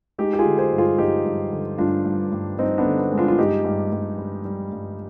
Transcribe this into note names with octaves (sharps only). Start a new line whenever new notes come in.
G#3 D#4 G4
G4
F4 G#4
D3
G#4 C5
G2
F4 G#4
G2 D#4 G4
G2
D3
G2 D4 F4
G2
G2
G2 C4 D#4
B3 D4
D3
B3
G#3
D4 F4
F4
G2 D#4 G4
G2
G2
G3
G3
G2